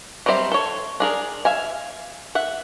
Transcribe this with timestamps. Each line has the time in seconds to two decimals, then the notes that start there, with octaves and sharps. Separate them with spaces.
0.26 F#3 G3 C4 C5 E5
0.52 A4 C#5
1.00 D4 G#4 A#4
1.45 E5 F5 G#5
2.35 E5 F#5